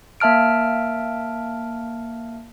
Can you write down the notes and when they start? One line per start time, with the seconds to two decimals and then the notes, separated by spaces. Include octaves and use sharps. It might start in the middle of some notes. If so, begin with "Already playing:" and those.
0.20 A#3 E5 A5 F6 D7